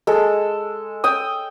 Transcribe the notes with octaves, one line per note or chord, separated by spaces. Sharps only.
G#3 A4
G5 D#6